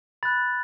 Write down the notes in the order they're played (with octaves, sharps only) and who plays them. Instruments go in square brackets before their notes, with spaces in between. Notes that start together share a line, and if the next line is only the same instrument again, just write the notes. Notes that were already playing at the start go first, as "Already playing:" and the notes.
[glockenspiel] B5 F#6 A6